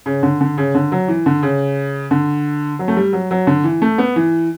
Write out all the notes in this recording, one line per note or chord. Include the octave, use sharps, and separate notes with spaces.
C#3
D3
D3
C#3
D3
F#3
E3
D3
C#3
D3
F#3
A3
G3
F#3
F#3
D3
E3
A3
B3
E3